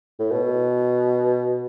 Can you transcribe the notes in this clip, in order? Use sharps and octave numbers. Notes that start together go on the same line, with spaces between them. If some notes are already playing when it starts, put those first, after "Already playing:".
A2
B2